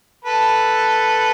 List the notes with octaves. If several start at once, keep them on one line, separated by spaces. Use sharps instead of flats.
A4 B4